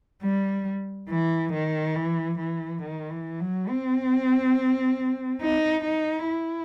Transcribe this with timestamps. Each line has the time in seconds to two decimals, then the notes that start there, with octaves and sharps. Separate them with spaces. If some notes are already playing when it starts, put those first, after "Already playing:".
0.22 G3
1.09 E3
1.53 D#3
1.95 E3
2.39 E3
2.82 D#3
3.10 E3
3.40 F#3
3.68 C4
5.42 D#4
5.85 D#4
6.28 E4